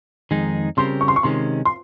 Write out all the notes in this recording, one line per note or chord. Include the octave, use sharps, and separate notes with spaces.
F2 D#3 G#3 D#4 G#4
C#3 G3 C4 G4 A#4 C6
C#6
C6
C#6
C3 D#3 G#3 C#4 C6
C6